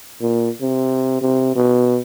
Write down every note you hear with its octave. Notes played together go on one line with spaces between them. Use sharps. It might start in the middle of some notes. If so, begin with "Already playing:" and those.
A#2
C3
C3
B2